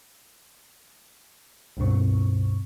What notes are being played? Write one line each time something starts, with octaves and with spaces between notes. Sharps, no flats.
C#2 G2 B2 C4 C#6